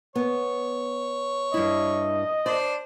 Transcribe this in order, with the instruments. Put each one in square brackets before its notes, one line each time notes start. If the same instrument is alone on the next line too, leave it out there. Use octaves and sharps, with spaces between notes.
[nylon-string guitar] B3 [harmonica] C#5
[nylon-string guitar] G2 E4 [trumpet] D#5
[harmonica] D4 C5 [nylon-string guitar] D5